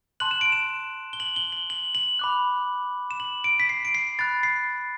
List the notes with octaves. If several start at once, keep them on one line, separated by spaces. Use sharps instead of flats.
A5 C6 F#6 F#7
E7
D7
E7
G7
F#7
G7
F#7
F#7
F#7
B5 D6 F#6
E7
F#7
D7
B6
C7
D7
C7
B5 F#6 A6
C7